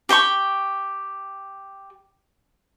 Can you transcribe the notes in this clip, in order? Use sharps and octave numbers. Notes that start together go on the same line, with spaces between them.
G4 G5 G#5 C#6